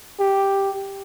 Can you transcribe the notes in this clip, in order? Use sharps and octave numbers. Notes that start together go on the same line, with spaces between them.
G4